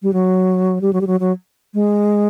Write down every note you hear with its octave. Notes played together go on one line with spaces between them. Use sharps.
G3
F#3
G3
F#3
G3
F#3
F#3
G#3